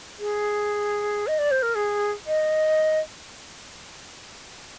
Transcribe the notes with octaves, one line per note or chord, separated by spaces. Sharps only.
G#4
D#5
D5
C5
A#4
G#4
D#5